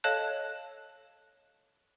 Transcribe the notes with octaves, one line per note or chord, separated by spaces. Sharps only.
A4 C#5 D#5 F5 A5 F#6